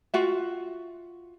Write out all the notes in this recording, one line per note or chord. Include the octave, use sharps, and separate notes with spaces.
F4 F#4 E5